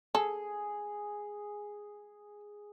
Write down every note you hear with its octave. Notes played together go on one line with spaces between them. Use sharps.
G#4 A4